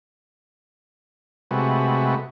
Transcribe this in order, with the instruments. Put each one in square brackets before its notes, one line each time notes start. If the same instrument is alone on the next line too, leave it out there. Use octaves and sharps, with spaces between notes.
[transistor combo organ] C3 G#3 A3 F#4 B4